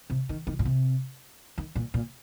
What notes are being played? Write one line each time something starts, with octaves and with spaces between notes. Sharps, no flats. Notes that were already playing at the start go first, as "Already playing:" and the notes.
C3
D#3
D#3
A#2
C3
D#3
A#2
A#2